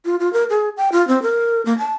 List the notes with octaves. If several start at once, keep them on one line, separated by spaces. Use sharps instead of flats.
F4
F4
A#4
G#4
G5
F4
C4
A#4
A#3
A5